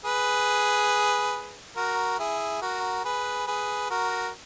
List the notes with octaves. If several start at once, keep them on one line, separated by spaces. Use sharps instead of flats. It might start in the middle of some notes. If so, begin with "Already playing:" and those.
G#4 B4
F#4 A#4
E4 G#4
F#4 A#4
G#4 B4
G#4 B4
F#4 A#4